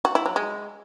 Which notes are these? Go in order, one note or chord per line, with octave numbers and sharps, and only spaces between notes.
F#4
E4
F#3
G#3